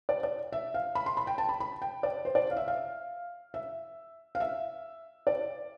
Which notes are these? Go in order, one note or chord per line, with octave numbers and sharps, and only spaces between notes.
D5
D5
E5
F5
B5
C6
B5
G5
A5
B5
B5
G5
D5
C5
D5
F5
E5
F5
E5
F5
E5
D5